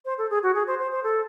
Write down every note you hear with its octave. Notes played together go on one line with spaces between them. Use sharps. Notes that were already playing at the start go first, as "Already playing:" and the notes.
C5
A4
G#4
F#4
G#4
C5
C5
C5
A4